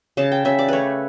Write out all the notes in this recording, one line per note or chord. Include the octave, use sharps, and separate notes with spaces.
C#3 A5
G5
C#3 E5
D5
A3 B4 C#5